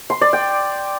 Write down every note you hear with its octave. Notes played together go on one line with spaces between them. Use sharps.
C6
D5
G5